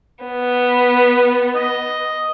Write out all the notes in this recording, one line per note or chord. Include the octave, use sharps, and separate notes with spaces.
B3
D#5